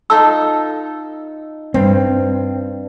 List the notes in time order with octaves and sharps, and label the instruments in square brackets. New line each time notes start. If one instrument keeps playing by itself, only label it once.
[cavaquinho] D#4 F4 A4 [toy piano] E6
[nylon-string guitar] G2 [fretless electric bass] C4